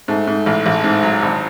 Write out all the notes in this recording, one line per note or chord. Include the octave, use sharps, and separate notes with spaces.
G#2 A3
G#2
A1
A1
G#2
F#3
G#1 D4